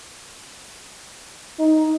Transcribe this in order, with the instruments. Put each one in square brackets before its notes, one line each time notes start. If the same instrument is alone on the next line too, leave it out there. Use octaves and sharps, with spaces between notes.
[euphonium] D#4